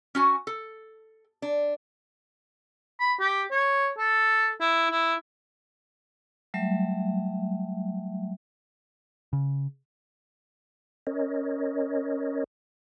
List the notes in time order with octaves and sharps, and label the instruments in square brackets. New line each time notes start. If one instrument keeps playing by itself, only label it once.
[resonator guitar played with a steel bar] C#4 F#4 G#5
A4
D4
[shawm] B5
G4
C#5
A4
E4
E4
[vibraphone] F#3 G3 A3 E5
[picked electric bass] C#3
[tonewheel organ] C#4 A#4 C#5 D#5